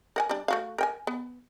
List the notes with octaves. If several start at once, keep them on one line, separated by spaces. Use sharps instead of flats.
A#4 F#5 G#5
G3 D4
A3 F#4 F5
A#4 G5 G#5
B3